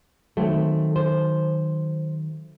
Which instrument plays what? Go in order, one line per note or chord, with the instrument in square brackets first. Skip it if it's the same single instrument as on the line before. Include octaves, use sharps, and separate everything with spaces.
[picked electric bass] D#3 F#3 [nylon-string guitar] A3 C4
[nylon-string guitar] C5